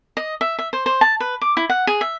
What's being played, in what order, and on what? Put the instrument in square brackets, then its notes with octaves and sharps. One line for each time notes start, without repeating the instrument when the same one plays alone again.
[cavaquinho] D#5
E5
E5
C5
C5
A5
B4
D6
E4
F#5
G#4
E5